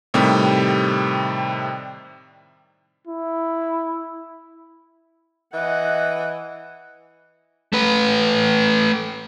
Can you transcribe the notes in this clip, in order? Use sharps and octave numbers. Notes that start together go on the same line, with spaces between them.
A2 C3 D#3 G3 G4
E4
E3 D#5 F#5
A3 B4